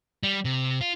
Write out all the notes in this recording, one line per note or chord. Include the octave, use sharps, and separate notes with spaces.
G3
C3
F4